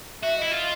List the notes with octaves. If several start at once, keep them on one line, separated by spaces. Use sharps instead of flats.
F#4 E5
E4 D#5
F4